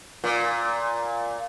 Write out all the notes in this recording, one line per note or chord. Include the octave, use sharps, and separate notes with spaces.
A#2